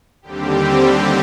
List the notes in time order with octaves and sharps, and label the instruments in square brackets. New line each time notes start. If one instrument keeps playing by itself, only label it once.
[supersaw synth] D#2 D3 G3 C4 G4